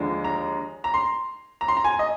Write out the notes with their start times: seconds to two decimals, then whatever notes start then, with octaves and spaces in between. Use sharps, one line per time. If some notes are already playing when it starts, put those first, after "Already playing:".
Already playing: D#2 D3 F3 G#3 D4
0.24 A#5
0.84 A#5
0.94 C6
1.61 A#5
1.68 C6
1.77 A#5
1.84 G#5
1.99 D#5